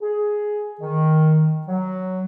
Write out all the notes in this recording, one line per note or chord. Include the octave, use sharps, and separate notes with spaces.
G#4
D#3
F#3